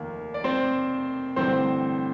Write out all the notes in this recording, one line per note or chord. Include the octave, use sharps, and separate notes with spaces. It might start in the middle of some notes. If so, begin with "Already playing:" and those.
Already playing: F1 D#2 D#3 A#3
D5
C4 C5
A1 G2 D3 C4 C5